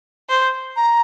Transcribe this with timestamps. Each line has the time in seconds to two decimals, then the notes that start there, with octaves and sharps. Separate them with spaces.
0.29 C5
0.76 A#5